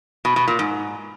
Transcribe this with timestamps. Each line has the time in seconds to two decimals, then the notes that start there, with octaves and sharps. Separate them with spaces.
0.25 B2
0.36 B2
0.48 A#2
0.59 G#2